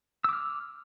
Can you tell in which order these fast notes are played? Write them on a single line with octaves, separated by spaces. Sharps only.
E6 D6 F6